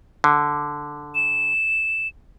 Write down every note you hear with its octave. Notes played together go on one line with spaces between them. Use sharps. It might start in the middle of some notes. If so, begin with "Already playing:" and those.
D3
E7